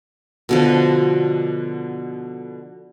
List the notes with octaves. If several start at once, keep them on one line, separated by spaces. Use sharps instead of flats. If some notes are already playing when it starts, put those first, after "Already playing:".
B2 D3 F3